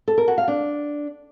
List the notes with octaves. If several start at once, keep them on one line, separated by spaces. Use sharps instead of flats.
A4
A#4
F#4
F5
D4